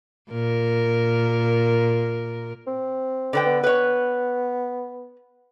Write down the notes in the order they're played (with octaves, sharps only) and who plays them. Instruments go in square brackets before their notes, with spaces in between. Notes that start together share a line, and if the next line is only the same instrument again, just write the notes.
[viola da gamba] A#2 A#4
[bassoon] C4
[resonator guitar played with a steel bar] D3 B4 G5
[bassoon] B3
[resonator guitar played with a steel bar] B4 C#5